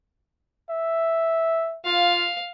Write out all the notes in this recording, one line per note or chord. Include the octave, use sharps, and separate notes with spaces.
E5
F4 F5